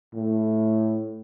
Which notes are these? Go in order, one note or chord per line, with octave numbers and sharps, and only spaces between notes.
A2